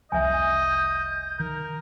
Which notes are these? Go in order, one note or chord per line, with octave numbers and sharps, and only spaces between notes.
F1 C2 F3 D#5 E5 G#5 G6
D#3 A#4